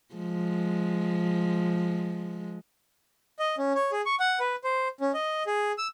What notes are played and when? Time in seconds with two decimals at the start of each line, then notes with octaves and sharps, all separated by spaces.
0.14 F3 G#3
3.39 D#5
3.58 C#4
3.75 C#5
3.92 G#4
4.06 C#6
4.20 F#5
4.40 B4
4.64 C5
5.01 C#4
5.14 D#5
5.47 G#4
5.78 E6